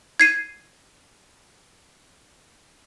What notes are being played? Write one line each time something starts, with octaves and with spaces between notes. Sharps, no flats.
G#6 C7 D#7